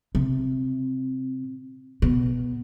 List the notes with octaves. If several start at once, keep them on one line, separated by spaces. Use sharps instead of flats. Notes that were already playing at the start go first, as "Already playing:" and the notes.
C3
B2